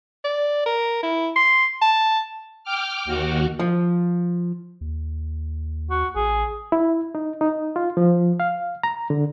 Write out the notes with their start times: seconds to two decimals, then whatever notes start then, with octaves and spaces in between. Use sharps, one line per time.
0.24 D5
0.66 A#4
1.03 E4
1.36 C6
1.81 A5
2.64 G5 D6 F6
3.05 D#2 F#4
3.59 F3
4.81 D#2
5.91 F#4
6.16 A1 G#4
6.72 E4
7.15 D#4
7.41 D#4
7.76 F4
7.97 F3
8.40 F5
8.83 A#5
9.10 D3